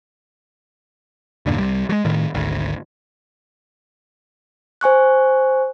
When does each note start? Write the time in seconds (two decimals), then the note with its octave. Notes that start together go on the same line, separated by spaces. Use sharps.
1.46 E2 G2 A#2 D3
1.58 C2 G3
1.89 F#3 G#3
2.05 A2 D#3
2.34 G#1 D2
4.81 C5 G#5 C#6 F#6